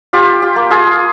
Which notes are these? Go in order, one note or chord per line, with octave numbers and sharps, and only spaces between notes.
F4 G4
G4
A#3
F4 G#4